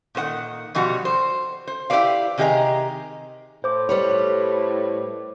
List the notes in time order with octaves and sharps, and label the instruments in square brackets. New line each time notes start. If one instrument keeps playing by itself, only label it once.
[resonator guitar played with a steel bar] A#2 D#3 C5 F#5
B2 F3 G3 F#4
C5
C5
E4 G4 A4 B4 D5 F5
C3 D#3 G4 G#4 D#5 A#5
[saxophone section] A2 [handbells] C5 D6
[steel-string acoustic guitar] G3 B4 C#5